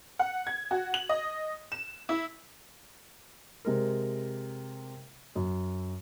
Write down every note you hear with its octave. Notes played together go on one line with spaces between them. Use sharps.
F#5
G#6
F#4
F#7
D#5
E7
E4
C3 G#3 A#4
F#2